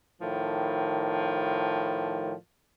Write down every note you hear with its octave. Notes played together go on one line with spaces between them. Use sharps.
A2 D#3 F3